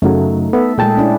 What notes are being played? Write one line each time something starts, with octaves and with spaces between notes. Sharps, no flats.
F#2 C#3 F#3 A3 D#4
B3 A4 E5
A#2 G#3 G#4 G5 A5
C#4 D4 E4